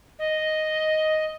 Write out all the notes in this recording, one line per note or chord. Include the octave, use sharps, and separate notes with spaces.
D#5